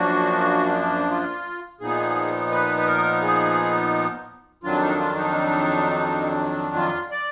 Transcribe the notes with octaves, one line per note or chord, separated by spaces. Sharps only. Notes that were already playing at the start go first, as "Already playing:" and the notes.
Already playing: F#2 F3 A#3 D4 F#4
F4
A#2 F3 B3 D#4 G#4
B4
B4
A#4
G#4
F2 D#3 F#3 D4 F4
D#4
F4
D#4
F4
D5